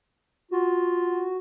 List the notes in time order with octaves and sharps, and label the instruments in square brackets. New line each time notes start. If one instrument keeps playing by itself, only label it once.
[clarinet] F4 [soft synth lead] F#4